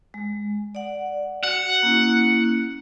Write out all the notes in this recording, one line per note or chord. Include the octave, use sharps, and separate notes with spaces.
G#3
D5 F#5
F#4 F#5
A#3 C#4 E4